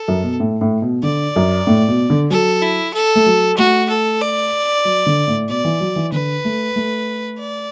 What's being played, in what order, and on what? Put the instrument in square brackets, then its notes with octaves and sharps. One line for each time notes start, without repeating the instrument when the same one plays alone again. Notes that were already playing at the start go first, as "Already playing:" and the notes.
Already playing: [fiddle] A4
[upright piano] F#2
B2
A2
A2
B2
[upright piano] D3 [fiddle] D5
[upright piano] F#2
A2
B2
D3
[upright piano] F#3 [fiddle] A4
[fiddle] E4
A4
[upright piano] A3
F#3
[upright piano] A3 [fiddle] F#4
[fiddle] A4
D5
[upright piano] F#3
D3
A2
[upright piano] B2 [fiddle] D5
[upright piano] E3
F#3
E3
[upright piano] D3 [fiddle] B4
[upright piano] A3
A3
[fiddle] D5